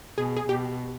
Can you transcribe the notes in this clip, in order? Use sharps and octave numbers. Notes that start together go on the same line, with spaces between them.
B2 G#4
G#4
B2 G4